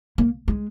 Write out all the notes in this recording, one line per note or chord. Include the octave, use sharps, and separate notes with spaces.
A#3
G#3